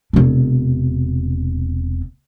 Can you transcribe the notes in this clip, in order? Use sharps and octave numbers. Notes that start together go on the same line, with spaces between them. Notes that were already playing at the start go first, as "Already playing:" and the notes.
E1 C3